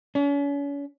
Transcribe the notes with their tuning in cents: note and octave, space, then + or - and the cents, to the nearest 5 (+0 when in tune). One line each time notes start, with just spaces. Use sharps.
C#4 +40